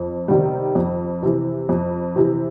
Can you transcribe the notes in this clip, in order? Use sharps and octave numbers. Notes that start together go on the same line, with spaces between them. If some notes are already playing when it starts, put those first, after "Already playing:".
Already playing: F2
C3 D#3 G3
F2
C3 E3
F2
C3 E3